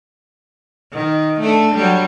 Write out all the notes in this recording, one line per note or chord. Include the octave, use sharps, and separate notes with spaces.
D#3
A3 D4 A4
F#3 G3